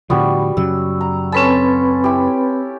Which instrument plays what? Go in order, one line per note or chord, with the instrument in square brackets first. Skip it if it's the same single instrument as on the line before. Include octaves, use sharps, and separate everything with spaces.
[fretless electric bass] A2 D3 F3 [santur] G3 B3 F#4
[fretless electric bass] F#2 C#3 F#3 [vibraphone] E6
[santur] A#5
[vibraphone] C4 B4 B5 [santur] C#4 A4 A5
[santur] E4 G4